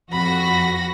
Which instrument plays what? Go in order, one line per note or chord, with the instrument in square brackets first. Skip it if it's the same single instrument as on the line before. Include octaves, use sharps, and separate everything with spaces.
[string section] F2 F#4 A#6 [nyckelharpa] B5